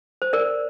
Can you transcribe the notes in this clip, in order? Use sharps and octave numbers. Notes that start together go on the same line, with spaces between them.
C5
A#4 D5